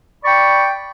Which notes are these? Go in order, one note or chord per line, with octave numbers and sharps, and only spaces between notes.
D5 G5 B5 C#6